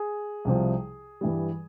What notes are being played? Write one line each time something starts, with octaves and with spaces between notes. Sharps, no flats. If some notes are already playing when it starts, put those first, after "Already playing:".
Already playing: G#4
C2 C3 F3
G2 E3 G3